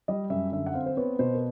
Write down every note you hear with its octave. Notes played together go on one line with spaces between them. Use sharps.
G3 D#5
F#2 E5
D3 E5
F#5
C4 F5
C5
B3 C#5
B2 C5
A#4